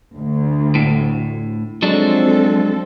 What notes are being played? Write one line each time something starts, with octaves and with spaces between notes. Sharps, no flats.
D2
A2
F3 F#3 G#3 C4 D4 A4